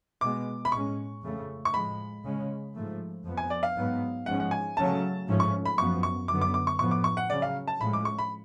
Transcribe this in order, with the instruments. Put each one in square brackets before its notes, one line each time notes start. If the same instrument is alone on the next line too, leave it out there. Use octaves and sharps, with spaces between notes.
[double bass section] B2 G#3 B3 [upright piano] D6
[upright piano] B5
[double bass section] A2 G#3 C#4 [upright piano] C#6
[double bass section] F2 C#3 F3 A3
[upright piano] C#6
[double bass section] A2 F3 G#3 [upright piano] B5
[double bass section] C#3 G#3 C#4
G#2 F3 A3
F2 F3 B3
[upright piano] G#5
D5
F5
[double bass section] G#2 F#3 B3
[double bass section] G#2 F3 G#3 C#4 [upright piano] F#5
[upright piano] F#5
G#5
[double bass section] C#3 F#3 A3 C#4 [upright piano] A5
[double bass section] G#2 F3 A3 C#4
[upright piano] C#6
B5
[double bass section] F#2 F3 B3 [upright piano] C#6
[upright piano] C#6
[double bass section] F#2 D3 F#3 B3 [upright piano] D6
[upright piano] D6
D6
C#6
[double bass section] A2 F3 B3 [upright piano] C#6
[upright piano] D6
C#6
F#5
[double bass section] C#3 F#3 C#4 [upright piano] D5
[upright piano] F5
A5
[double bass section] A2 F3 G#3 C#4 [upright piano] B5
[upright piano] D6
C#6
B5